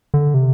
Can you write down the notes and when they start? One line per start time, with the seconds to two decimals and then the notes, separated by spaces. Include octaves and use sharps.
0.14 D3
0.34 C3